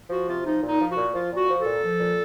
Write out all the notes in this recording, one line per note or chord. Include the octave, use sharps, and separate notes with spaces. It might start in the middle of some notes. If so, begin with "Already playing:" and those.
F3 F#4
C3 F4
F3 D#4
A#2
D#4
F3
F#4
A#2
F3 F4
A#2
F#4
F3
A4
A#2
F3
A#2